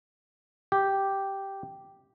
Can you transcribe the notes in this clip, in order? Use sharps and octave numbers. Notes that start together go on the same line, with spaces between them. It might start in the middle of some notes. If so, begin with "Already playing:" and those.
G4